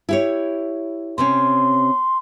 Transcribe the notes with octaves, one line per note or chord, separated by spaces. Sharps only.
E4 G4 C#5
C3 C4 C#4 C6